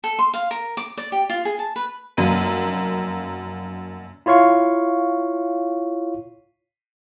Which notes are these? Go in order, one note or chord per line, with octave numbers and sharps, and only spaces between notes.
A4
C6
F5
A#4
D6
D5
G4
F4
G#4
A5
B4
F1 F#2 A#3 D#7
E4 F4 C#5 F5 C#6